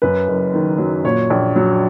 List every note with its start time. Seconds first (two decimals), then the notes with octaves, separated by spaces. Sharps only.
0.02 F#2 B4
0.28 F#1
0.54 D#3
0.78 F#3
1.04 A#2 C#5
1.30 A#1
1.56 F#3